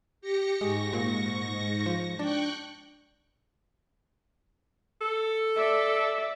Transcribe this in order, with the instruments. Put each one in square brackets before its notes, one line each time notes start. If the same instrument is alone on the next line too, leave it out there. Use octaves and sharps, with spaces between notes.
[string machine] G4 A#6 C#7
[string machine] G#2 C#6 A#6 [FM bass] G#3
[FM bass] A#2
F3
[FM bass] D4 [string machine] G5 C#6 F#6
[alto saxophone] A4
[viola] D5 E5